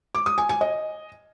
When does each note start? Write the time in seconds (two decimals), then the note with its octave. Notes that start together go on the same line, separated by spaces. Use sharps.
0.15 D6
0.26 D#6
0.38 G#5
0.49 G#5
0.61 D#5